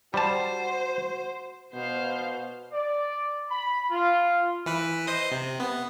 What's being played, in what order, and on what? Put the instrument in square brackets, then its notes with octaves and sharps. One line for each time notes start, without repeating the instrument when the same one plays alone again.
[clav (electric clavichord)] G3 A5 [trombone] F#4 [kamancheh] C5
[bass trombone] B2 [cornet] B3 [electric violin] C5 F5
[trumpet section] D5
B5
F4
[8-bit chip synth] E3 B4
C5 D#5 D#6
C3
B3